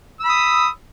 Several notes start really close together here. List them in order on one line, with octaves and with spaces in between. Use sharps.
E6 B5 D#6